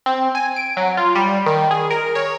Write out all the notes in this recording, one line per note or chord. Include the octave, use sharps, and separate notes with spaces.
C4
G#5
D7
F#3
F4
G3
D#3
G#4
A#4
C#5